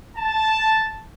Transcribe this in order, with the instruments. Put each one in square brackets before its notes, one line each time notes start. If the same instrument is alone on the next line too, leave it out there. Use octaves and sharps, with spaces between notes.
[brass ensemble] A5